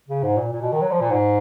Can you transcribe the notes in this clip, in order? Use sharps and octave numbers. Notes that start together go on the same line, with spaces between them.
C#3
G#2
A#2
A#2
B2
D#3
F#3
F3
A#2
G#2